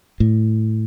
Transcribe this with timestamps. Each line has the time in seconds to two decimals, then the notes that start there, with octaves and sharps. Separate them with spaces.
0.20 A2